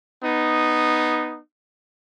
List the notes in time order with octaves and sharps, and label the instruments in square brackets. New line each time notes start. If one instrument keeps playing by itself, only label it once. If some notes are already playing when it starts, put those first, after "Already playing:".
[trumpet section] B3 D#4